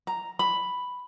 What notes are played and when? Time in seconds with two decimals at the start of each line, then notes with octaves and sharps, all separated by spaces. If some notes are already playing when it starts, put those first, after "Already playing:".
0.07 A#5
0.39 B5